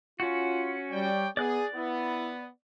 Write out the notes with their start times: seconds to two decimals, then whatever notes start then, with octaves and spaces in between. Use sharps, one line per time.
0.20 C#4 F4 F#4
0.91 G3 C#5 D5 G5
1.37 B3 G#4 D5 F#6
1.74 B3 E4